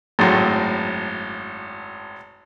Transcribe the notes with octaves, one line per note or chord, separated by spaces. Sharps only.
G#1 F#2 A2